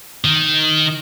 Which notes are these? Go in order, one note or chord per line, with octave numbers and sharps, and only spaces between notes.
D#3